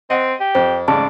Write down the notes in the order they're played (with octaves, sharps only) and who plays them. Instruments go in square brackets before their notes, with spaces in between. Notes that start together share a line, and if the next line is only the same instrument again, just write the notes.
[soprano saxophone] C4 [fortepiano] D#5 F#5
[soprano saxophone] G4
[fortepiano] F2 [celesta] C5
[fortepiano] A1 G#2 C#3 [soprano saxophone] D5 [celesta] A5